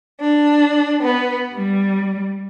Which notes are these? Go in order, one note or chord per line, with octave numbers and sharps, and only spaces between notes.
D4
B3
G3